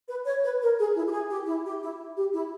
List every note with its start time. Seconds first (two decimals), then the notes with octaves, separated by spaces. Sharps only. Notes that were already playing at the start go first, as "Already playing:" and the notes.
0.09 B4
0.26 C#5
0.44 B4
0.61 A#4
0.78 G#4
0.95 E4
1.07 G4
1.12 G#4
1.30 G4
1.46 E4
1.65 G4
1.82 E4
2.16 G4
2.33 E4